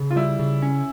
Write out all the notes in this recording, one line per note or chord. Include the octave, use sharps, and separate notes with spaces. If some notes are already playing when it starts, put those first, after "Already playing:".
Already playing: C#3
F4
G3 E4
C#3
C#4